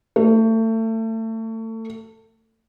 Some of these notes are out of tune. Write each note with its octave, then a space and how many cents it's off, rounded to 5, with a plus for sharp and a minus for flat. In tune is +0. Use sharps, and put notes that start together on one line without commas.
A3 +30